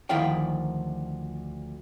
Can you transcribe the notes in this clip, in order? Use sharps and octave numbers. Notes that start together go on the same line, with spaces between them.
D2 D#3 F3 E4 F5 G5